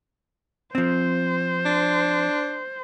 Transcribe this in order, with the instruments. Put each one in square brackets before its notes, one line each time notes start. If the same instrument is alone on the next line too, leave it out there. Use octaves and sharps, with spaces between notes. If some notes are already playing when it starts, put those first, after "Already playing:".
[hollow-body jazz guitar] F3 C4 [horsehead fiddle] C5
[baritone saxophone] D4